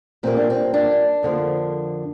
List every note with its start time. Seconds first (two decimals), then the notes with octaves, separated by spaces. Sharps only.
0.23 A#2 G3 A#3 C4
0.37 D4
0.50 C4
0.74 D4
1.23 F2 D3 F3 A#3